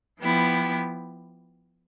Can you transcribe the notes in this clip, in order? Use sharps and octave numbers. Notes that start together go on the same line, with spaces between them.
F3 B3 E4 G4